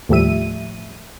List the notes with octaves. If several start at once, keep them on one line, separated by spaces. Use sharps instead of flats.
D#2 A2 F3 G3 E5 D#7